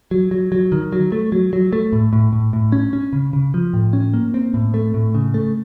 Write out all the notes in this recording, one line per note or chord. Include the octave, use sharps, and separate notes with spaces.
F#3
F#3
F#3
D#3
F#3
A3
F#3
F#3
A3
A2
A2
A2
A2
C#4
C#4
C#3
C#3
F3
A2
C#4
A#3
C4
A2
A3
A2
C#3
A3